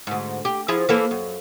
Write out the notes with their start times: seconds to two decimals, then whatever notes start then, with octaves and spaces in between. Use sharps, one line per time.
0.07 D2 G#2
0.45 G4
0.68 F3 E4 G#4
0.89 E3 A#3 A4
1.11 F#2